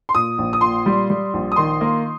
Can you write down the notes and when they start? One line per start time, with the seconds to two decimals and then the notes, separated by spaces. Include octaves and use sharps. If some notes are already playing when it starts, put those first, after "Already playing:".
0.09 C6
0.15 A#2 D#6
0.38 A#1
0.53 D#6
0.61 A#2 C6
0.86 G3
1.10 G3
1.34 A#1
1.52 D#6
1.56 D#3 C6
1.81 A#3